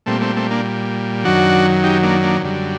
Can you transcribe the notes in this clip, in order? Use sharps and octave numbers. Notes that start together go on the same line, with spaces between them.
A#2 G3 A3 C4
A3 C4
A3 C4
A#3 D4
F#2 D#3 F#3 D4 F#4
D#4 G4
A#3 D4
A#3 D4
F#2 D3 G3